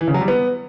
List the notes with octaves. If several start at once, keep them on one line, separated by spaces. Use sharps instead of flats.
E3
C#3
F#3
G3
B3